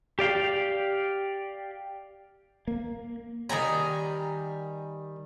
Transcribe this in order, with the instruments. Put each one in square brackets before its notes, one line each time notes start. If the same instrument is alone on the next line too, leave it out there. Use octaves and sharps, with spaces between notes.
[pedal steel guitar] G4 D5 F5 G5
[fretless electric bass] A#3
[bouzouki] D#3 G3 G#5 A#5